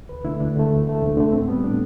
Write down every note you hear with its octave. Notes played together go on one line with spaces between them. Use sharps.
D2 B4
D3 A3 E4
D2 D4
D3 A3
D2
D3 A3
D2
D3 A3
A2 C4
G3 B3
A2 D4